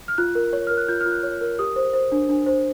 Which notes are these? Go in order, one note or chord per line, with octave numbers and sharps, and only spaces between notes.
F6
F4 F#6
A#4
C#5
A#4 F6
F#6
F4 G6
F6
F4
F#6
C#5
A#4
G4 D#6
C5
C5
D4
D4
C5